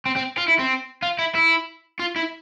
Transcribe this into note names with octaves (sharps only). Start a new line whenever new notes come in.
C4
C4
F4
E4
C4
F4
E4
E4
F4
E4